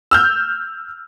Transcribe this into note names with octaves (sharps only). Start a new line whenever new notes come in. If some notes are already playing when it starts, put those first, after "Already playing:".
E6 F6 G6